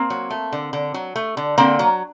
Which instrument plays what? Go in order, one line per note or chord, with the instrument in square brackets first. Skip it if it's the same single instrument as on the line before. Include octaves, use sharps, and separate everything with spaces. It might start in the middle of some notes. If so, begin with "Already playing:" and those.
Already playing: [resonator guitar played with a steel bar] A#3 C4
F#3
A3
D3
D3
F#3
A3
D3
D3 A#3 C4
F#3